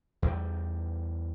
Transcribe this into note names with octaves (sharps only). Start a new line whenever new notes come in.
E2 G3